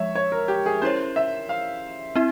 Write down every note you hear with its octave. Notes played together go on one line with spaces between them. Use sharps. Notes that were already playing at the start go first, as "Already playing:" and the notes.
Already playing: F3 G#3 C#5 E5
C#5
A#4
G4
G#4
C#4 E4 A#4 C5 C#5
E5
F5
C4 E4 E5